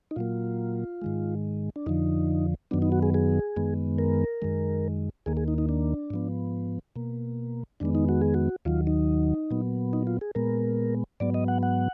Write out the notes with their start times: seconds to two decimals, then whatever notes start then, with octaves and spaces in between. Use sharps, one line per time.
0.11 D#4
0.16 A#2 F#3 A#3 F4
1.02 G#2 D#3 G#3
1.76 D4
1.86 F2 D3 F3 D#4
2.71 F#2 D#3 F#3 B3 D4
2.82 D#4
2.92 F#4
3.03 G#4
3.14 G#4
3.56 F#2 D#3 G#3 B3
3.99 A#4
4.42 F#2 D#3 G#3
5.26 D#2 D#3 A#3 G#4
5.37 G#4
5.48 D#4
5.58 D#4
5.69 D4
6.10 G#2 F3 B3
6.96 B2 A#3
7.80 F2 D#3 G#3 B3 D4
7.95 D#4
8.09 F#4
8.22 G#4
8.34 F#4
8.65 D#2 D#3 F#3 F4
8.87 D#4
9.51 A#2 F#3 B3
9.93 D#4
10.07 F4
10.21 G#4
10.35 A#2 G#3 B3 A#4
11.20 G#2 F#3 B3 D5
11.34 D#5
11.48 F#5
11.63 F#5